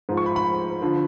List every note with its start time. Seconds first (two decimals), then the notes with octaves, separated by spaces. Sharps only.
0.09 G#2 F3
0.17 C#6
0.26 B5
0.36 B5
0.82 D3 F3